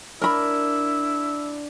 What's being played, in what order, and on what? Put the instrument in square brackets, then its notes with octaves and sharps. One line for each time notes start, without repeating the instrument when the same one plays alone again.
[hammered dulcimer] D4 [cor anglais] E4 [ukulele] A#4 B5